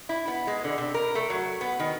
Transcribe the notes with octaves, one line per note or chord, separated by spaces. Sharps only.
E4
B3
G#3
D3
C3
A#4
A3
F#3
B3
D#3